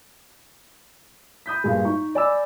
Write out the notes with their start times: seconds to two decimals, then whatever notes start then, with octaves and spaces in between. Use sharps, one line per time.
1.46 B5 D#6 G6 B6
1.64 G2 A#2 G#3
1.85 D#4 C#6
2.15 D5 D#5 G#5 B5 D6 E6